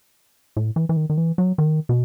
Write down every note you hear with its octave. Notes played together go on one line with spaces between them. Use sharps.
A2
E3
E3
D#3
D#3
E3
F#3
D#3
B2